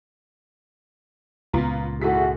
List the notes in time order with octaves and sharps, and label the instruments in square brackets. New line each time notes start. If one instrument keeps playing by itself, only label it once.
[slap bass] C#2 A#2 [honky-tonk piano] B3 F4 A#5
[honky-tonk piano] G#2 A4 B6 [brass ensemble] E4 F#4 G#4